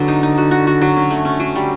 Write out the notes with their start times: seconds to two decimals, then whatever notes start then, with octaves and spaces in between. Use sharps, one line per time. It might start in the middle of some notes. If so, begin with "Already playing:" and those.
Already playing: D3 F#3 B3
0.08 D#4
0.23 D#4
0.38 F#4
0.51 F#4
0.67 F#4
0.81 F#3
0.96 C#4
1.10 A3
1.25 C#4
1.40 F#3
1.56 G3